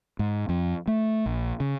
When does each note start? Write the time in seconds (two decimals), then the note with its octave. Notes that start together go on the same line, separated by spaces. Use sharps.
0.19 G#2
0.49 F2
0.87 A3
1.26 A#1
1.60 C#3